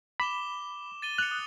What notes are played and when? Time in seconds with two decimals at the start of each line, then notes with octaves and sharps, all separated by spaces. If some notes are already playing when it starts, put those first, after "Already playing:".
0.20 B5 D6 E7 G7
1.02 A6 D#7 G7
1.18 F#6 C#7 F7
1.31 D#6